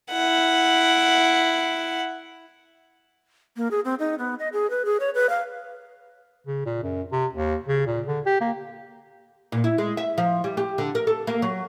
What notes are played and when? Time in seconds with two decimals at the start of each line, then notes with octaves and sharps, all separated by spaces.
0.11 E4 F#5
3.57 A#3
3.71 G#4
3.85 C4
3.99 D#4
4.19 B3
4.39 D#5
4.53 G#4
4.70 B4
4.85 G#4
5.00 C#5
5.15 B4
5.29 F5
6.47 C#3
6.66 A#2
6.83 F#2
7.12 C3
7.33 D#2
7.68 C#3
7.86 A#2
8.06 D3
8.26 G4
8.41 A#3
9.52 A#2
9.64 E4
9.78 G#3
9.97 E5
10.18 F3
10.44 G3
10.57 G4
10.78 D3
10.95 A#4
11.07 A4
11.27 A#3
11.42 F#3